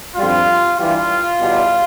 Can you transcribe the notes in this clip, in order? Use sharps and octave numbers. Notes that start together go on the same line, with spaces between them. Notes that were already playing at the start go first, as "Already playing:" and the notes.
F2 D3 G3 F4
G2 E3 G3 F4
E2 B2 G3